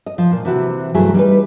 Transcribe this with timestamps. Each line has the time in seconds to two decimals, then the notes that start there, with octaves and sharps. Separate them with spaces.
0.06 D#5
0.18 F3
0.32 A#2
0.45 C3 E3 F#4
0.94 G2 E3 F#3 A3 G#4
1.14 G3 D#4 B4